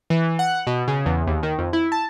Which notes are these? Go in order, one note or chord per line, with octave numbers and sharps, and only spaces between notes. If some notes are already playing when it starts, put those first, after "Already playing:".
E3
F#5
B2
C#3
E2
D#2
D#3
F2
E4
A5